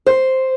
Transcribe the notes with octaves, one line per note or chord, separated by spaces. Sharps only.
C5